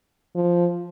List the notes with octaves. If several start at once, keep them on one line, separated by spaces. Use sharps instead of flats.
F3